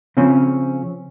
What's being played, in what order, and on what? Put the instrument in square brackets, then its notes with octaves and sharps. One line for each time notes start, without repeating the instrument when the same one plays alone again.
[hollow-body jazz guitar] C#3 F3 C4 C#4